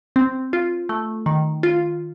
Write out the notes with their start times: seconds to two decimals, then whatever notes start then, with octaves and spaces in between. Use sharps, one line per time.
0.16 C4
0.53 F4
0.89 A3
1.26 D#3
1.63 F4